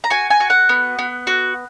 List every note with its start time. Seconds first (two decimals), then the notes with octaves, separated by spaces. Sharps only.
0.04 A#5
0.10 F#4 G#5
0.30 G#5
0.40 F#4
0.50 F#5
0.69 B3
0.99 B3
1.27 F#4